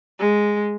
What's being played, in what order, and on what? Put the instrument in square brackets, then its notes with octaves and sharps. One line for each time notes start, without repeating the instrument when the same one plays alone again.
[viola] G#3